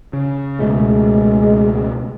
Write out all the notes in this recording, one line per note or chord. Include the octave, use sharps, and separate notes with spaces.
C#3
C#2 B2 G#3 A3